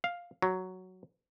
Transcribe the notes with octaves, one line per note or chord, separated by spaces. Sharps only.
F5
F#3